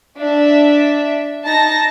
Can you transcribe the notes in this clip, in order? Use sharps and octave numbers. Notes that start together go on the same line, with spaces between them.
D4 E5
D#4 A5 A#6